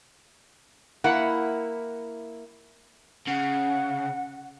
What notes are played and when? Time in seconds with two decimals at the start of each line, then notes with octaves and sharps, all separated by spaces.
1.04 A#3 E4 F#5
3.28 C#3 F#5